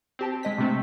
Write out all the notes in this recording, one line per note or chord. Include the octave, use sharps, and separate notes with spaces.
C4 G4 A5
G#3 D#5 B6
C3 A3 C4